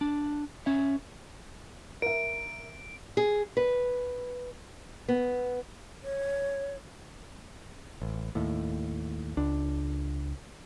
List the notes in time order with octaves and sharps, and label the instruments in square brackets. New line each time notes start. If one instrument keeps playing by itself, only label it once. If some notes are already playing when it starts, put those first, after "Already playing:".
[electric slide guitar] D4
C#4 E5
[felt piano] A#4 E5 [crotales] D7
[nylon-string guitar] G#4
B4
B3
[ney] C#5
[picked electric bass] A1
D#2 A2
C#2 D4